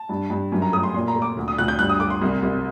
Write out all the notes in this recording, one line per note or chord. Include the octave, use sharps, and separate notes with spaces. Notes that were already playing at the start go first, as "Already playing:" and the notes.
Already playing: A5
G2
G2
F#2
A#5
A3 D#6
C6
A#2 C6
A#5
A3
D6
D2
D#6
D2 F#6
G6
G2 F#6
D#6
A3 D6
C6
C2
C2